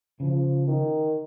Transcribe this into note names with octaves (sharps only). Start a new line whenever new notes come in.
C#3 F3
D#3